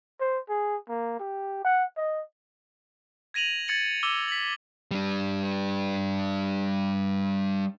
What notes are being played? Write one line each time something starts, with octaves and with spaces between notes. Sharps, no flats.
C5
G#4
A#3
G4
F#5
D#5
G#6 A#6 D#7 F7 F#7
G#6 A6 C#7 F#7
D6 E6 G7
B6 F#7
G3 D4